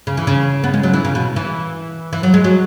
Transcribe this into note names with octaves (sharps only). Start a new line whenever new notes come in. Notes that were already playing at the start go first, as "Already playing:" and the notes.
C#3
E3
C#3
B3
G#3
F#3
E3
C#3
B2
E3
E3
F#3
G#3
F#3